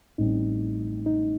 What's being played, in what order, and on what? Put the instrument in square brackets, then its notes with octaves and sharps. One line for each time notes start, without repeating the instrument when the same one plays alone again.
[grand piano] A1 A2 G3 C4 [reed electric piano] D#4
[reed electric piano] D#4